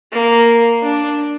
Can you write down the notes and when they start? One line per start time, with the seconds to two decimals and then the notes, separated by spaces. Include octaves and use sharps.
0.12 A#3
0.82 D4